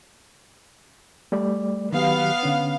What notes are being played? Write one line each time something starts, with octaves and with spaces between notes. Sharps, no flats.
G3 A3 D5
D#3 F#3 B3 G4 F5
D3 C#4